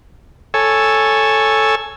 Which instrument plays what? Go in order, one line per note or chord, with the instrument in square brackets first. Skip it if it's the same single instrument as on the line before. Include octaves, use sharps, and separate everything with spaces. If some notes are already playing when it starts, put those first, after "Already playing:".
[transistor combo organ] A4 C#5 G#5 E6